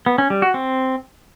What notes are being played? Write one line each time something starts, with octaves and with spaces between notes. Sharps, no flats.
B3
C#4
G3
F#4
C4